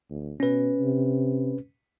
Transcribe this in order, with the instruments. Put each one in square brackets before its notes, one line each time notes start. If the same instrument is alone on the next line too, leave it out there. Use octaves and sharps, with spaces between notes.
[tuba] D2
[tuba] B2 [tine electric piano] C#4 B4
[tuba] C3